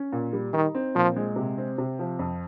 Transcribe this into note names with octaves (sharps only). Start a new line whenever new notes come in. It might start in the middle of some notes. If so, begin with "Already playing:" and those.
Already playing: C#4
A#2
G3
D#3 D#4
C4
A#2 F3
G#3
C3
C4
C3
F3
F2